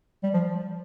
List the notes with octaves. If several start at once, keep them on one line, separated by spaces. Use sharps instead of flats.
G3
F3